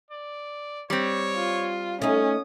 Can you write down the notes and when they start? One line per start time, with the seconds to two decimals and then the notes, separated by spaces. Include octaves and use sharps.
0.11 D5
0.90 G3 C4 C#5
1.35 F4
2.02 A3 C#4 D#4 D#6